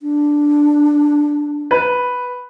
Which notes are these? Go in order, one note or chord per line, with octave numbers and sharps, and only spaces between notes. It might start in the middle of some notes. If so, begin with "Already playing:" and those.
D4
B4